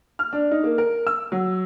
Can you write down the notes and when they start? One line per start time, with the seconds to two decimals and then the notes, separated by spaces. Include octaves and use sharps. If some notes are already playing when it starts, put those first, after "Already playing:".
0.19 F6
0.33 D4
0.51 D#4
0.64 A#3
0.78 A#4
1.07 E6
1.32 F#3